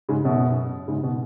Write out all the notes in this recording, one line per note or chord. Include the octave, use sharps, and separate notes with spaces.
G#2 C#3
F#2 B2
G#2 C#3
B2